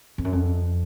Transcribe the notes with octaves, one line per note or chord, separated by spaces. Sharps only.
F2
F#2
F2